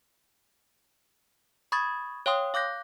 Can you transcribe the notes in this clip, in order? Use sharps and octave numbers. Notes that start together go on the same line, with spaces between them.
B5 C#6 D#6 G#6 A6
C#5 F5 G5 C6 D#6
F5 D6 F#6 G6 A#6